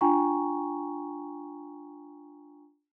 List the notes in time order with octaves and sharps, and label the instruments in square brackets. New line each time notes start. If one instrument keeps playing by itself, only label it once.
[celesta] D4 F4 G5 G#5 A#5 C#6